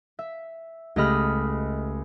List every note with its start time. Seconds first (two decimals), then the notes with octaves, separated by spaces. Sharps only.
0.19 E5
0.96 C#2 A3 G4 D#5 B5 F6